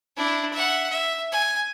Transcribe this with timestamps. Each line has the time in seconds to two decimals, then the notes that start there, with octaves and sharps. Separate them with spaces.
0.17 D4 E4
0.52 E5 F#5
0.90 E5
1.32 G#5